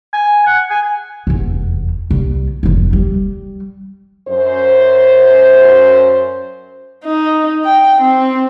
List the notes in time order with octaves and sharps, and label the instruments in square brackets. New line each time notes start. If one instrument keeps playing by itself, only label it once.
[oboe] G#5
F#5
G#5
[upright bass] F1 E2
C2
F1 F3
G3
[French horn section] F#2 C5
[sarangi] D#4
G5
C4